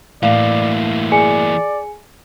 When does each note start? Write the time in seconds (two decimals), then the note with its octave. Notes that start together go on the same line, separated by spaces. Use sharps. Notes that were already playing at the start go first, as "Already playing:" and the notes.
0.23 A2 E3 A#3 D5 F5
1.12 G#4 D5 G#5 C#7